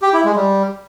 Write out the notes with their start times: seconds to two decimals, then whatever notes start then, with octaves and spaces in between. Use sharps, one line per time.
0.02 G4
0.13 E4
0.25 G#3
0.36 G3